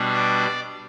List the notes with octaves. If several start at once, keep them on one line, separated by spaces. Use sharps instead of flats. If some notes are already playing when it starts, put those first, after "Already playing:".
Already playing: B2 G3 D4
D5